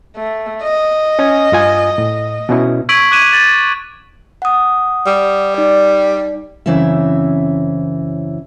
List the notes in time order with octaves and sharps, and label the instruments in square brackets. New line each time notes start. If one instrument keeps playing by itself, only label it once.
[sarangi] A3
D#5
[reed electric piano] C#4 C#5 G#5
G2 F4 G#5
A2
B2 C#4 E4
[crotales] C#6 E6 G#6 B6 D7 F#7
D6 F#6 G#6 D#7 E7
A6 F#7
[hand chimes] F#5 D#6
[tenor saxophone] G3
[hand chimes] D#4 D5
[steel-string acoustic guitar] F#2 C#3 E3 C4 E4 E5